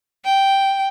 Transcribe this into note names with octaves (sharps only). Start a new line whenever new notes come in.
G5